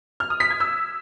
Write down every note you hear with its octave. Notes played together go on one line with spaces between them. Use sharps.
F6
D#6
B6
G#6
E6